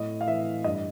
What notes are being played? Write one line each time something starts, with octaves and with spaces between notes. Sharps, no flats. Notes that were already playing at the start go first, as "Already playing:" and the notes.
Already playing: A2 D#5
F5
E3 E5
G2 D#5